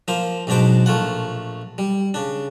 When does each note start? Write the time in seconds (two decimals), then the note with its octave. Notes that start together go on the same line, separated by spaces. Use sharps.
0.08 F3 A#3 C5
0.47 B1 G#2 B2 D4 C5 D6
0.86 A#1 A3 F4 F#5
1.78 G3
2.14 C#3 D4